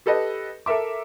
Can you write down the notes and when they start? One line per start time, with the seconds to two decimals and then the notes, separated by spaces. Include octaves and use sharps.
0.06 G4 A4 B4 D#5
0.66 A4 A#4 E5 D6